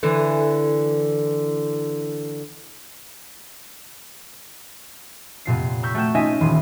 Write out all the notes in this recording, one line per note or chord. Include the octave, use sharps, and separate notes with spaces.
D3 E3
F1 A#2 C7
A#5 C#6 E6 G6 B6
A3 F#4 G5 G6 E7
C#4 D#4 F4 D#5 E5 G#5
D#1 E3 C6 D#7